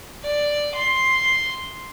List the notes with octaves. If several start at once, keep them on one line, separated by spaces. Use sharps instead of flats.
D5
C6